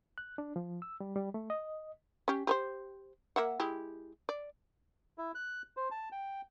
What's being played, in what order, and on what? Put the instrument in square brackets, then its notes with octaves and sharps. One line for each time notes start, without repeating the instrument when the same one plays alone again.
[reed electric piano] F#6
D4
F3
E6
G3
G3
A3
D#5
[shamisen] C#4 G4
G4 B4 C5
A#3 E5 F#5
G#3 E4 G4
D5
[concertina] E4
F#6
C5
A5
G5